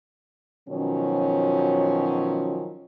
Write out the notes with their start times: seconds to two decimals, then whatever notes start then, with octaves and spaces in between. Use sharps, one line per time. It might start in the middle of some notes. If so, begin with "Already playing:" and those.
0.69 B2 D#3 F3 F#3 C#4